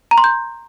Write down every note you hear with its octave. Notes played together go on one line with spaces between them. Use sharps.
A#5
C6
G6